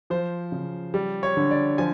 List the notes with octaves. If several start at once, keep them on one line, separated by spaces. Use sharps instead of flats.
F3 C5
C#3
G3
C#5
D3
D5
F3 G#5